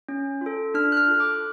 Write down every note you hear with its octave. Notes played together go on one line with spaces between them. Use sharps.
C#4
F4 A4
D4 F6
F#6
F6
F4 A4
D6